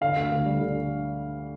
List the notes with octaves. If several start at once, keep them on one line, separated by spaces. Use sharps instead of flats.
D3 F5
D2
D2
G3
D3